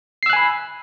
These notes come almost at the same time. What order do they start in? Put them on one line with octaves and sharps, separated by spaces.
C7 E6 F#6 G#5 B5